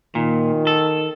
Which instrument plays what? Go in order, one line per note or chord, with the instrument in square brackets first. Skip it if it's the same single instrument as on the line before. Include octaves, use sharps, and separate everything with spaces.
[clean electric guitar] A#2 [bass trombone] D#3
[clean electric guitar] A4